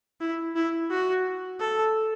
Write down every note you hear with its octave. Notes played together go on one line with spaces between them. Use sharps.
E4
E4
F#4
A4